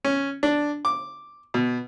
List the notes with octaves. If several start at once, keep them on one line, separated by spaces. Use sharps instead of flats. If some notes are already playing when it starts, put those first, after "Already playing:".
C#4
D4
D6
B2